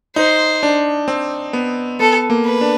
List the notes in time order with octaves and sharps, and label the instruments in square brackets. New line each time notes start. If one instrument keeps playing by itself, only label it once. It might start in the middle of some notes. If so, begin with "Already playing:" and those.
[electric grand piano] D#4 [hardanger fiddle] C5
[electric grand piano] D4
C4
B3
[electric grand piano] B3 [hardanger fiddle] A4
[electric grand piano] A#3
[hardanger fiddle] B4
[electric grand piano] D4